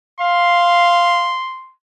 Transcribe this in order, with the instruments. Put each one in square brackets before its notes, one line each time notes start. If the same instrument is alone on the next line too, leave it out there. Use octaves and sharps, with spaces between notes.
[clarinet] F5 [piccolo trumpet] C6